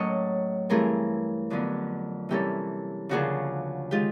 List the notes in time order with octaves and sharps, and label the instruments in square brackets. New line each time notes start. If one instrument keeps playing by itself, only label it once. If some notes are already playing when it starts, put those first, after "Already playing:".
Already playing: [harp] A2 F#3 A#3 C#4 C#5 D#5
G2 E3 A3 C4 G#4 A#4
F2 D3 F#3 B3
C3 E3 G3 A#3 C#4 G4 A4
D2 C#3 F3 A#3 C#4 F#4 G#4
D#3 G#3 F4 G4